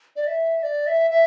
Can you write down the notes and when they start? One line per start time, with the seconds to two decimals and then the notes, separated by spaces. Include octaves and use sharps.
0.16 D5
0.27 E5
0.63 D5
0.87 E5
1.11 E5